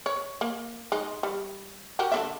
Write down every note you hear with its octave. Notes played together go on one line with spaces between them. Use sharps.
C#5
A#3
G#3 D#4
G3
F#4 G4 A#4
D3 B3 E5